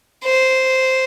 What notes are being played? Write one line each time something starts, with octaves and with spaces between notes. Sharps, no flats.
C5